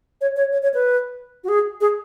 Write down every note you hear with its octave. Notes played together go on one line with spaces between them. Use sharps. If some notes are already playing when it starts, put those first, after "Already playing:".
C#5
C#5
C#5
C#5
B4
F#4
G#4
G#4